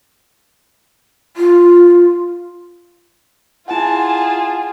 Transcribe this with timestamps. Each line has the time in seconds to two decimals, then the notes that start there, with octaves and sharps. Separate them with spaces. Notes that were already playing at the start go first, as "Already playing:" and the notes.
1.37 F4
3.68 E4 F4 G#4 F#5 G#5 A5